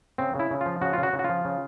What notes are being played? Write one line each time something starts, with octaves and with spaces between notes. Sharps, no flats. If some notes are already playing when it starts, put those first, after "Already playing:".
C#3 C4
C#3 E4
C#3
F4
F3
C#3 F#4
F4
C#3
F#4
C#3
F#4
F3 F4
C#3